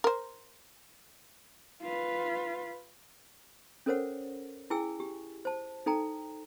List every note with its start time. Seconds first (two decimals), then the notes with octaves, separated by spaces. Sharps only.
0.04 A#4 C5
1.82 F4 B4
3.86 C#4 A4 A#4 C5 C#5 F#5
4.70 E4 G#4 G5 G#5 E6
5.00 G4
5.45 C5 A5
5.86 D#4 A4 G5 A#5